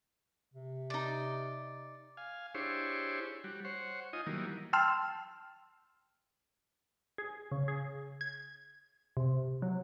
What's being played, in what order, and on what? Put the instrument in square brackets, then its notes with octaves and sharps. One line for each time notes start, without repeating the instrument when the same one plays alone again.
[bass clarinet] C3
[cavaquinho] D#4 D5
[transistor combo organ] F5 G#5
D4 E4 G4 G#4 C5 C#5
G3 F#4
C5 C#5 F#5
D#4 F4 D#5 G#5
D#3 E3 F#3 G3 A#3
[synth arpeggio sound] G5 A5 C6 E6 F6
[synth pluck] G#4
C#3
G#4
G#6
C3
F#3